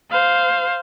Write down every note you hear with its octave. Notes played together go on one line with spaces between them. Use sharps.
C5 F5